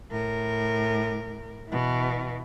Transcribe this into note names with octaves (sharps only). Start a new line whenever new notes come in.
A2 A#4
B2 E3